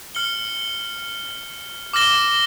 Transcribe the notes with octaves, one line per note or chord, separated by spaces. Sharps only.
F6 C#7 G7
D6 F6 A#6 E7 G7